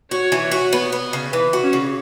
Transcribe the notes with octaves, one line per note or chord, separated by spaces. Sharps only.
F#4 C#5
E3
F#4
B3
B3
C#3
E3 B4
F#4
C#4
C#3